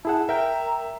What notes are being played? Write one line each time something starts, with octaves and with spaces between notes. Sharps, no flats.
E4 G#4 F#5 A5
A#4 E5 G5 A#5